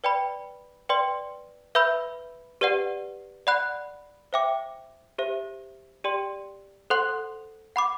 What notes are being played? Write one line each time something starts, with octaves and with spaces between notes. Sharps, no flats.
B4 D5 G5 B5
B4 D5 G5 C6
B4 E5 B5 E6 G6
G4 B4 D5 F#5
D5 F#5 B5 F#6
C5 E5 G5 D6
G4 C5 E5
G4 D5 G5 C6
A4 C5 F#5 C6 F#6
F#5 B5 D6